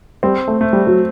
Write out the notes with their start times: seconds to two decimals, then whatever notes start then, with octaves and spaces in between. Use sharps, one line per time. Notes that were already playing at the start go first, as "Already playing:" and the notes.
0.23 G3 C4
0.48 A3
0.61 A3
0.73 G3
0.87 F#3